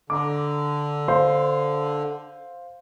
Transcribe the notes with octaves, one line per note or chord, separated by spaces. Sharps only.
D3 A#5 D6
C5 F5 C6